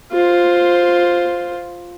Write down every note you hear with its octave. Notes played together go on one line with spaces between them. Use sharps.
F4 C5